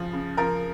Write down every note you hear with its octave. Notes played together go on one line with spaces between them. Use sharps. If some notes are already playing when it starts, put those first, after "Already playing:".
Already playing: C#3 F3
C#3
F3 A#4